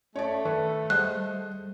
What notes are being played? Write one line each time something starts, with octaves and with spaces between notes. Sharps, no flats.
A3 C#4 C#5 D5
D#3 A4 B4 A5 C#6
G3 G#4 C5 D#5 F#5 F#6